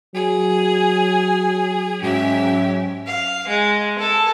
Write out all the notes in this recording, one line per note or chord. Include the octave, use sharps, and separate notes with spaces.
F#3 G#4
G#2 F#3 C#4 G4 E5 G#5
F5
G#3
A4